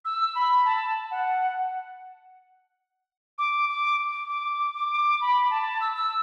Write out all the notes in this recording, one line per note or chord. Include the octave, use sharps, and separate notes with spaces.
E6
B5
A5
F#5
D6
D6
D6
D6
B5
A5
E6
E6